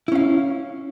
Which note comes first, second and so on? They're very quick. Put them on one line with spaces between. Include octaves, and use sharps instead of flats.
E4 C#4 F5